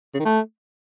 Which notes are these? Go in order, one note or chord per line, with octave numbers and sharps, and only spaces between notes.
C#3
D#3
A3